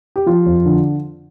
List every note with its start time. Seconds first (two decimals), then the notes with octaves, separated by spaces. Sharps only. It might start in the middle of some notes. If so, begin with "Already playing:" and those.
0.16 G4
0.26 F3 F4
0.46 F2
0.65 D3